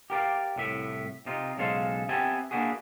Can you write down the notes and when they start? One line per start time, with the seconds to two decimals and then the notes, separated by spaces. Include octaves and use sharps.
0.10 G4 A#4 D5 F5
0.56 C2 A2 E5
1.26 C3 D#4 F4
1.57 B1 C#3 G#3 A4 C5 F5
2.09 B3 C4 G4 E5 G#5 A5
2.51 A#3 C4 D4 E4 F#4 G#4